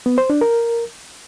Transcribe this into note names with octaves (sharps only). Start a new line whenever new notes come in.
B3
C5
D4
A#4